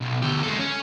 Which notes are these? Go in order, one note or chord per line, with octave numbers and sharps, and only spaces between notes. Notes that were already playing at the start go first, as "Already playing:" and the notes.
B1
D2 G4
G#3 A4
C#4